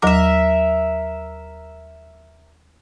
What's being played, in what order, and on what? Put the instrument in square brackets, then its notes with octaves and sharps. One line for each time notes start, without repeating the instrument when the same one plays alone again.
[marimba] D#2 F#3 D6 [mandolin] A#4 E5